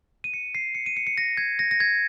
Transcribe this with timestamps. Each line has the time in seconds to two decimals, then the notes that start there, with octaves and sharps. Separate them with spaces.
0.24 D#7
0.34 C#7
0.55 C7
0.75 C#7
0.86 D#7
0.97 C#7
1.07 C#7
1.18 A#6
1.37 G#6
1.59 A#6
1.71 A#6
1.80 G#6